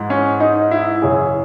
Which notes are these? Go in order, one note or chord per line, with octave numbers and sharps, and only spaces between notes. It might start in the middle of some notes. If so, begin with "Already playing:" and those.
Already playing: G#2 E3
C#4
D#4
E4
F#2 C#3 E3 G#4